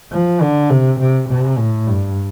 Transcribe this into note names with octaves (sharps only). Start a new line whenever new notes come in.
F3
D3
C3
C3
C3
A2
G2